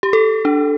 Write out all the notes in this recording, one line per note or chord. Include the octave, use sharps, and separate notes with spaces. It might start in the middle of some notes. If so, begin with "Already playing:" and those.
G4
A4
D4